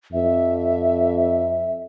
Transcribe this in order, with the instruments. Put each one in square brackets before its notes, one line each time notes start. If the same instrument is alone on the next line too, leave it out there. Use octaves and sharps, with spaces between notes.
[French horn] F2 [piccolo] E5